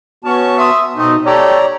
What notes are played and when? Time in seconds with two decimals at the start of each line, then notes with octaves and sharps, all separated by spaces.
0.24 B3 C#4 F#4 C#5 A5 C#6
0.57 E5 C6 D#6
0.96 B2 A3 C4 D#4 D#5
1.26 A3 G4 A4 C#5 D5 A#5